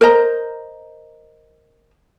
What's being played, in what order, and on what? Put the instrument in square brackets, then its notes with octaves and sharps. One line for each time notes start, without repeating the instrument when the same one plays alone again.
[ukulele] A#4 C5 D#5 A#5